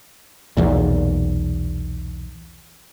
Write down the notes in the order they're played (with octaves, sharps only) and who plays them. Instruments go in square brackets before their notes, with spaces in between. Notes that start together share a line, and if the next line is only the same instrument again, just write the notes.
[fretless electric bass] B1 E2 A#2